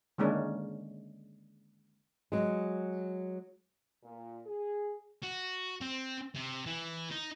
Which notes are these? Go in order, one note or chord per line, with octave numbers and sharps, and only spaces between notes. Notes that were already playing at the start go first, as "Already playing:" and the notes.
D3 D#3 G#3 A#3 C#4 D4
F#3 G#3
A#2
G#4
F#4
C4
C3
E3
D#4